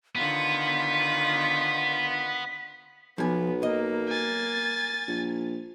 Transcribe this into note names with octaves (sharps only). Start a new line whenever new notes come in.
D3 D#3 B3 F4 B6
B1 F3 B3 G#5
A#3 D#5
G#5 A6
A#1